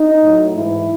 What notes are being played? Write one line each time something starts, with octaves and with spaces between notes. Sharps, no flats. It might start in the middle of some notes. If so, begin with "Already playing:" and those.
Already playing: D#4
A2 F#3
G#2 E3 E4